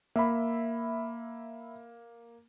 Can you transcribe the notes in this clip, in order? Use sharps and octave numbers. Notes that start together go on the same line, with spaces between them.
A#3 E5 B5